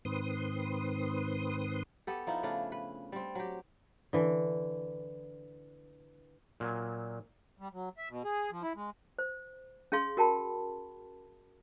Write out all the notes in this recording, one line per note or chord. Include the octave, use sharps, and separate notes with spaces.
G#2 D#3 C4 B4 C6 D#6
B3 G4 A4
F3 D#4 E4
C#3 A3 D4
B4
G3 C4
F#3 G4
D3 E3
A#2 F#3 G#5
G3
F#3
E5
B2
G#4
F3
E4
G#3
C5
C#4 G#4 F5 C6
F#4 A#4 G5 A5 B5